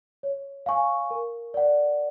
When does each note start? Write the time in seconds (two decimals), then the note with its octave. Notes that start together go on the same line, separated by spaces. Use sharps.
0.23 C#5
0.66 F5 G#5 C#6
1.11 A#4
1.54 D5 F#5